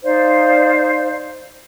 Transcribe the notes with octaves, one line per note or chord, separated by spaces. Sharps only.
D#4 C5 D5 F5